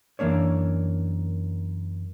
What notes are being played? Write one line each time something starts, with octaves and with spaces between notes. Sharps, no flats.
F#2 E3 A#3 D4 C#5